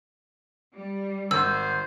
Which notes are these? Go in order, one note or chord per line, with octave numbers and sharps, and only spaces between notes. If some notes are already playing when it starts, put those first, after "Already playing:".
G3
G#1 C5 E6